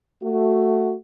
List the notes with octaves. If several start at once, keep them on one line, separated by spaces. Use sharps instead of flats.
A3 F#4